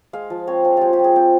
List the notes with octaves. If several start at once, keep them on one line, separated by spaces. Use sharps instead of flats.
G#3 F5
F3
C4 C#5
F3
G#3 F4 G4
G4
F3 G#4
C4 G5